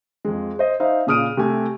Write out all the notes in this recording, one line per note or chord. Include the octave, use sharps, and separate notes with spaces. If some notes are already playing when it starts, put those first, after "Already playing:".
F2 G#3
C5 D#5
D#4 C5 E5 F5
A#2 C#3 D#6 F6 D7 D#7
C3 A3 G#5